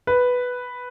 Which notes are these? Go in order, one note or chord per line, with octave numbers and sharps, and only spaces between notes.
B4